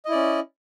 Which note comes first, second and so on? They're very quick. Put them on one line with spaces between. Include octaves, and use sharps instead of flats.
D#5 E4 D5 C#4